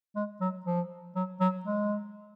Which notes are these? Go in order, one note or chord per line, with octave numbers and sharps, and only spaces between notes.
G#3
F#3
F3
F#3
F#3
G#3